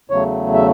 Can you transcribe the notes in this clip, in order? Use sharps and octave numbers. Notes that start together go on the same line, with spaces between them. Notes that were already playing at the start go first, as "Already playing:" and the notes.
E2 C#3 F#3 A3 C#5
E5